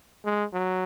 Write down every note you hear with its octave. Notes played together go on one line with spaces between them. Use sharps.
G#3
F#3